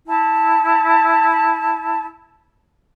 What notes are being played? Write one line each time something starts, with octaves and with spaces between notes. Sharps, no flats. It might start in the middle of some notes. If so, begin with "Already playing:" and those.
E4 A5